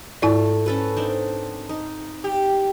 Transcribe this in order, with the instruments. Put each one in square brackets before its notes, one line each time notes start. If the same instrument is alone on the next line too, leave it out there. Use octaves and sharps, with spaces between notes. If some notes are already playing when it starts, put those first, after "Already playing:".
[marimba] G#2 E4 D5 [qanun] A3
[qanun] C#4 A4 B4
C4 D4 D#4
D#4
[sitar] G4